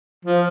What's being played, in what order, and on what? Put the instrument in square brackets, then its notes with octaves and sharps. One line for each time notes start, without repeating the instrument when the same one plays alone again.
[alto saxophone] F3